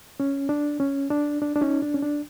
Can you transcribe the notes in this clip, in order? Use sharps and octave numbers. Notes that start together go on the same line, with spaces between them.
C#4
D4
C#4
D4
D4
D4
C#4 D#4
D4
C#4
D4